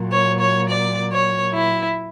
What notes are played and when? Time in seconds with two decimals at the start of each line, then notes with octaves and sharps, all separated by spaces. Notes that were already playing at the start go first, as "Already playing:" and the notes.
Already playing: A#2 F#3
0.12 C#5
0.40 C#5
0.69 D5
1.11 C#5
1.54 E4